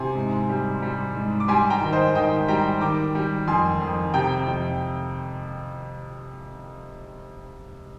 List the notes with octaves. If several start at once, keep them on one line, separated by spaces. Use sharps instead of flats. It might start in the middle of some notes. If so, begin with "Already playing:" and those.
Already playing: C3 G#5 C6
G#2
G3
G3
G#2
D6
G3 G#5 C6
G5 A#5
D#3
C5 D#5
D#3 D#5 G5
G3 G5 A#5
D#3 A#5 D6
G3
F2 G#5 C6
F2
C3 G5 A#5
F2